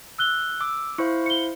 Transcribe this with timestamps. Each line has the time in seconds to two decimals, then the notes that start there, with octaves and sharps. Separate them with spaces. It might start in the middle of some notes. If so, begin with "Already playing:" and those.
0.18 E6 F#6 G7
0.61 D6 E6
0.98 E4 C5 F5 C#6
1.26 C#7 G7